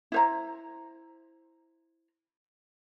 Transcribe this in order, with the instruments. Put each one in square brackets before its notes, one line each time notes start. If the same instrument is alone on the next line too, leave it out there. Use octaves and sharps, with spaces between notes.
[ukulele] E4 C5 A#5